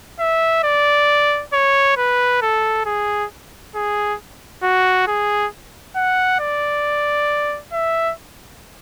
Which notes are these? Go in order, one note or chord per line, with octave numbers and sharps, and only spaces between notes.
E5
D5
C#5
B4
A4
G#4
G#4
F#4
G#4
F#5
D5
E5